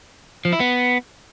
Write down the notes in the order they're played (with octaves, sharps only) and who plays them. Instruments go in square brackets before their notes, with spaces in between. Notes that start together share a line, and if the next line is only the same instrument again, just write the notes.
[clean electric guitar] F3
E4
B3